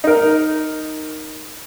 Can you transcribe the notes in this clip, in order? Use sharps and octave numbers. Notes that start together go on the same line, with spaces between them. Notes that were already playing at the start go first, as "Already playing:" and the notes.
D#4 A#4